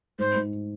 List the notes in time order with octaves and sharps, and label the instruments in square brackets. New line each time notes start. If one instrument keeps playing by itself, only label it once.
[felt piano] G#2 [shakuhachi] C5
[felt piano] G#2